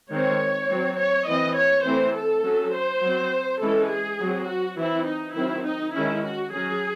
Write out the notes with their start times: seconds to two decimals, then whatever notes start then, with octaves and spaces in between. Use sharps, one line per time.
0.10 D#3 G#3 C4 C#5
0.69 F#3 C4
0.98 C#5
1.27 E3 C4 D#5
1.56 C#5
1.85 E3 A3 C4 C5
2.15 A4
2.44 F#3 C#4
2.73 C5
3.02 F#3 C4
3.61 E3 G#3 C#4 A4
3.90 G#4
4.19 F#3 C4
4.48 F#4
4.78 E3 C4 E4
5.07 D#4
5.36 D#3 F#3 C4 E4
5.65 D#4
5.94 D#3 G#3 C#4 E4
6.24 F#4
6.53 F#3 C#4 G#4